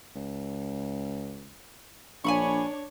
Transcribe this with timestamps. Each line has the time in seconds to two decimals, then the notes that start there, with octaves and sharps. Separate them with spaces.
0.16 C#2
2.24 A#1 D4 C#5 G#5 B5 C#6